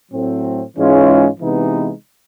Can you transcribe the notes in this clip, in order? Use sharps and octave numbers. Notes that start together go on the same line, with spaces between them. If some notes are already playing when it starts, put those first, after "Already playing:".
A2 F#3 A3 C4
G#2 E3 G#3 C#4 F4
C3 E3 G#3 B3 D#4